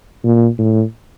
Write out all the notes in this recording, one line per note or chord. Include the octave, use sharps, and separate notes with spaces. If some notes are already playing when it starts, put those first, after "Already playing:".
A#2
A2